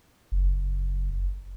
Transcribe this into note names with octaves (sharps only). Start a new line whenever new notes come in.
F#1